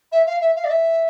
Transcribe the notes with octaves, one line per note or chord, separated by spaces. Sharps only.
E5
F5
E5
F5
D5
E5